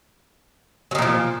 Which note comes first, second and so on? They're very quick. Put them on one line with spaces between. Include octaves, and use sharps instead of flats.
F#3 D#3 A#2 F3